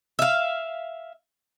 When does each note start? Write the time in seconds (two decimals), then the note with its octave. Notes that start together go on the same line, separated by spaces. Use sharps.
0.19 E5 F5